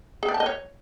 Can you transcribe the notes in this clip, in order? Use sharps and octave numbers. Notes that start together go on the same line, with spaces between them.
G#4
D5
A5
D#5
C#5